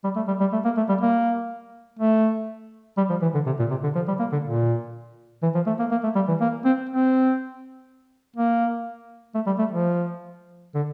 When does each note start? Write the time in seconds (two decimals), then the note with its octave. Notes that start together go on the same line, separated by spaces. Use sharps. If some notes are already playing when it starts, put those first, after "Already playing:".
0.04 G3
0.16 A3
0.28 G3
0.40 G3
0.52 A3
0.65 A#3
0.77 A3
0.89 G3
1.01 A#3
1.99 A3
2.97 G3
3.10 F3
3.22 E3
3.34 D3
3.46 C3
3.59 A#2
3.70 C3
3.83 D3
3.95 F3
4.08 G3
4.19 A#3
4.32 D3
4.44 A#2
5.42 E3
5.55 F3
5.66 A3
5.79 A#3
5.91 A#3
6.03 A3
6.15 G3
6.28 E3
6.40 A#3
6.65 C4
6.89 C4
8.36 A#3
9.34 A3
9.46 G3
9.58 A3
9.71 F3
10.74 D3